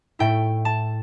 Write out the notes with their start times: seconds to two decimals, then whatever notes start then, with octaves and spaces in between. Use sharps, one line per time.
0.19 A2 A3 E4 G5
0.65 A5